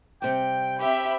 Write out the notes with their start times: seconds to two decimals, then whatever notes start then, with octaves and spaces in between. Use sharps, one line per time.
0.22 C3 G3 G5
0.80 C4 G4 E5 B5